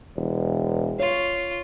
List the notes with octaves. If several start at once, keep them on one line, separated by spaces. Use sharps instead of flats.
E1
F4 C#5